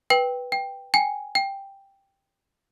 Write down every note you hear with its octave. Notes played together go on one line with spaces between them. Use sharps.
B4 G5
G5
G5 G#5
G5